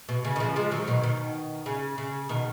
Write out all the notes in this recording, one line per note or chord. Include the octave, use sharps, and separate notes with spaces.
B2
C#3
D#3
C#3 F3
F3 G#3
D#3 F#3
B2 D#3
B2 D#3
C#3
C#3
B2 D#3